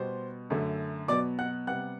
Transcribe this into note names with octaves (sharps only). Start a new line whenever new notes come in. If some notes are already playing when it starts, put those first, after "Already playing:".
Already playing: B2 G3 B3 C5 C6
F#2 D3 A3
B2 F#3 B3 D5 D6
F#5 F#6
C3 G3 B3 F#5 F#6